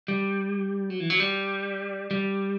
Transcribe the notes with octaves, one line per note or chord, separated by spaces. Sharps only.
G3
F#3
E3
F#3
G3
G3